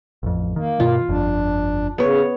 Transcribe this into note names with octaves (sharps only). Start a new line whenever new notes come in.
A1 F2
D#3 A#3
G2 B2 D#3 F4
G1 F2 D4
C#3 B3 C#5